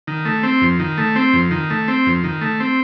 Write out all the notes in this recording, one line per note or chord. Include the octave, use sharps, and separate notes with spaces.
D#3
A3
C4
F2
D#3
A3
C4
F2
D#3
A3
C4
F2
D#3
A3
C4